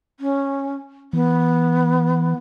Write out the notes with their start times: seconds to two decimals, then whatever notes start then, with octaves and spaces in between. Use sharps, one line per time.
0.20 C#4
1.13 E3 B3